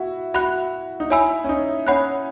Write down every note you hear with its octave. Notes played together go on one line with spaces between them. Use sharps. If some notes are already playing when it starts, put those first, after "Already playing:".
Already playing: E4 F#4
F#4 E5 B5 F#6
D#4
E4 C#5 G#5 B5 E6
C#4
D#4
C#4 C#5 F#5 B5 F#6